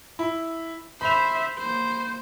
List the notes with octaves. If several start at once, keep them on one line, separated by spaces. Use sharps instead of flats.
E4
C5 E5 B5 F7
A#3 C5